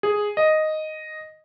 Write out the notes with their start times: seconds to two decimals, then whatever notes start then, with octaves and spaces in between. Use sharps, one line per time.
0.03 G#4
0.37 D#5